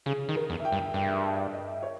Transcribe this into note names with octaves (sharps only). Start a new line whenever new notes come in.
C#3 G#4
D#3
A#4
E2
E5
G5
G2
G2 G5
E5
D#5
C#5